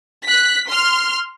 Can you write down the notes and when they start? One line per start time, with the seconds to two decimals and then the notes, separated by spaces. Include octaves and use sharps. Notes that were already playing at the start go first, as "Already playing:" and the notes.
0.25 F#6 B6
0.67 C6 F6